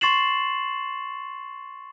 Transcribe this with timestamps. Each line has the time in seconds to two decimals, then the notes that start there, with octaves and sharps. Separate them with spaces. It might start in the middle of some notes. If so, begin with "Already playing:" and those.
0.01 C6 C#6 A6 C7 E7 F#7